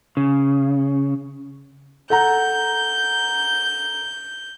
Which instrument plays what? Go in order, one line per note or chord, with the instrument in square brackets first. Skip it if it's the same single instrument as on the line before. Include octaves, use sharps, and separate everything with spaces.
[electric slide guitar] C#3
[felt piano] A4 F#5 A#5 [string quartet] G6